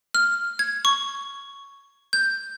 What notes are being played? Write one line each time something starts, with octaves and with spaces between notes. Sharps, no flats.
F6
G#6
C#6
G6